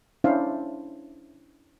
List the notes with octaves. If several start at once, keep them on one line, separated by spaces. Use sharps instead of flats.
C#4 D4 E4 C5 E5 F5